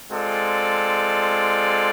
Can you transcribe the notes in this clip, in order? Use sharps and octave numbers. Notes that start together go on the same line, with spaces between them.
G#3 C4 F4 A4 D5